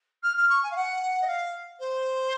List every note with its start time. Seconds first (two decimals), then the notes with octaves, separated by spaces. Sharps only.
0.23 F6
0.37 F6
0.49 C#6
0.63 G#5
0.71 F5
0.76 F#5
1.21 D#5
1.27 F5
1.79 C5